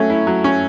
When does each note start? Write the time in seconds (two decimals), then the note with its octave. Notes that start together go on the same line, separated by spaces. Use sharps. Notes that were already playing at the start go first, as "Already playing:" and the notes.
Already playing: F#3 A3 C#4
0.10 E4
0.27 F#3
0.44 C#4